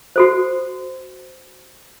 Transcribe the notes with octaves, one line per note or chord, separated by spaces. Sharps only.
F#4 A4 C5